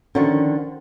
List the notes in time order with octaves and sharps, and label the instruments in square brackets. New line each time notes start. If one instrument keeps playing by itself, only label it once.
[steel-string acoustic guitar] D3 D#3 F3 [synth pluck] C#4